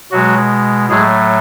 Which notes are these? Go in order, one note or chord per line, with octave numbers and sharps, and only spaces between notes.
B2 F#3 G#3 F#4
A2 F#3 G#3 A3 G#4